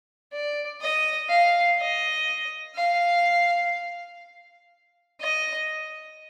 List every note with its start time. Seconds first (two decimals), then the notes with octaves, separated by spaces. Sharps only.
0.33 D5
0.81 D#5
1.29 F5
1.79 D#5
2.76 F5
5.20 D#5